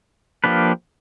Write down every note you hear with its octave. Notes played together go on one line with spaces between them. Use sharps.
F3 A#3 D4 G4 B4